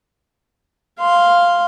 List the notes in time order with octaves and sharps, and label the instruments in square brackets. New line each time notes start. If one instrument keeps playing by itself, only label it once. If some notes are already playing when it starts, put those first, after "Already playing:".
[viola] F5 C6